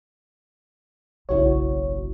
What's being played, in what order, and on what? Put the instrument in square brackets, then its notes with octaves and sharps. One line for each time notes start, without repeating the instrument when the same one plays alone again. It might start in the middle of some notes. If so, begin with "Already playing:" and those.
[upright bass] F#1 B1 [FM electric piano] E4 F#4 C#5